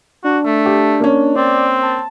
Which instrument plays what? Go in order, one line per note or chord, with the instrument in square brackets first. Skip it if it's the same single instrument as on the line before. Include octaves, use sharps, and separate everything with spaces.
[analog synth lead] D4 [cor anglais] F#4
[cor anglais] A3
[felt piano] G4
A#3 C#4
[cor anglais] C4 [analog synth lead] D5
[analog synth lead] A5